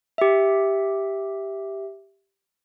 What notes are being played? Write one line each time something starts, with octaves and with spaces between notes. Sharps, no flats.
G4 E5